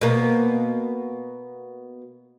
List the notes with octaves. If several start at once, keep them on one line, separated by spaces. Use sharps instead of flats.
B2 A#3